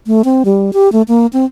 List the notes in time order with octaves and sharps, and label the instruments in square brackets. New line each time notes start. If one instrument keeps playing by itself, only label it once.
[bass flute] A3
C4
G3
G4
A3
A#3
C4